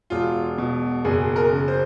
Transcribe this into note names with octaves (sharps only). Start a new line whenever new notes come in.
E1 F4
B2
F#1 G#4
A#4
C#3
C5